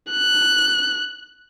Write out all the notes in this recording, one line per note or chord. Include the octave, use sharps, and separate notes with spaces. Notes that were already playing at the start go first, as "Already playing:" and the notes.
F#6